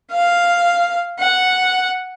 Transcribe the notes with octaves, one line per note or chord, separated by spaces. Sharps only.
F5
F#5